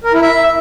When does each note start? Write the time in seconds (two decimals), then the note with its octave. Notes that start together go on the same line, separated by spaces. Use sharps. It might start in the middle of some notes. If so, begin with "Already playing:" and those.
0.04 A#4
0.13 E4
0.22 E5